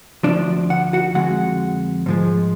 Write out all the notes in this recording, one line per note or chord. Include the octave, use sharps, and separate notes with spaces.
C#3 F3 D4 D5
D2
F#5
F#4 F#5
F2 D3 G#3 F#4 F#5
G#2 F3 G#3